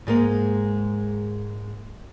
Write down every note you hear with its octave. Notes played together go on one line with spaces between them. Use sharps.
G#2 G#3 A#3